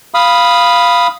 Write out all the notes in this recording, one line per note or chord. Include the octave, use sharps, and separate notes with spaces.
F5 B5 D#6